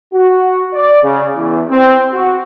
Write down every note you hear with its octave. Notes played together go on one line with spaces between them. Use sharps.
F#4
D5
C#3
E2
C4
F#4